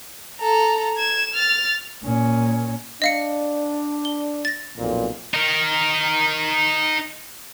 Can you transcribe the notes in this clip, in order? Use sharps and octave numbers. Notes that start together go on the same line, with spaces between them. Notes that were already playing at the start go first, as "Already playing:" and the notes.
A4 A#5
G#6 E7
F6 A6
A#2 C#4
D4 D#5 F5 C#7
G7
A6 A#6
B1 F2 A#2
D#4 A#4